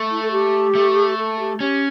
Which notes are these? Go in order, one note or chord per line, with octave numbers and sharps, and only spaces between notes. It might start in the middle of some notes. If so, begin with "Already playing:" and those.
Already playing: A3
E4
A4
G4
A3
A4
G4
C#4 G4